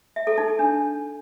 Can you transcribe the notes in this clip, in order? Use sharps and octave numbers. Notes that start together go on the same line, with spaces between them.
E5
A4
D#4
A4
D4